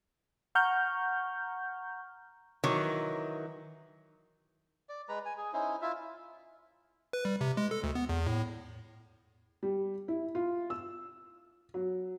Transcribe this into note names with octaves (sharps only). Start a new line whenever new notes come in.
F#5 A#5 C#6 F6 G6
D#3 E3 F#3
D5
G#3 B4 A#5
G#5
G#4
C#4 D#4 E4 C5
E4 F4 E5
B4
G3
C3
G#3
A4
D2
B3
E2
A2
G3
E4
F4
E6
F#3